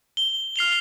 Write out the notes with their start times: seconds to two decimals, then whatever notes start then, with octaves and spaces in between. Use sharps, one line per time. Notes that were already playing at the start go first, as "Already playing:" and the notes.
0.17 G7
0.56 F6 C7 F7 G7